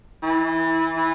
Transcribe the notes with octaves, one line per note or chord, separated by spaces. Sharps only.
E3
E3